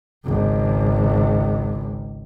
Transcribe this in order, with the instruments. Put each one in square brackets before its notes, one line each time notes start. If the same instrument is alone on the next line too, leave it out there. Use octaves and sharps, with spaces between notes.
[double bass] G#1 C#2